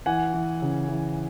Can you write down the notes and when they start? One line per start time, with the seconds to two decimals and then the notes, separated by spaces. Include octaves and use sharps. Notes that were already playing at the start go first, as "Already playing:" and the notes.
0.06 E3 F#5 G#5
0.34 E3
0.62 C#3
0.89 E3